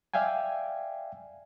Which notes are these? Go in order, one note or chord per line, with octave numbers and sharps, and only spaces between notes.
D5 E5 F5 G5 G#5